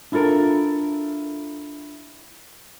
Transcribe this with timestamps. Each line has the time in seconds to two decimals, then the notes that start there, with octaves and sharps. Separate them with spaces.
0.12 D4 E4 F4 A4 A#4